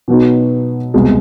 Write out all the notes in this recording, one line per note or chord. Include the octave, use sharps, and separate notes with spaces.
B2 F#3 B3 D#4
C2 B2 G#3